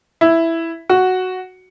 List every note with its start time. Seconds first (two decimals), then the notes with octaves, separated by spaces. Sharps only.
0.21 E4
0.89 F#4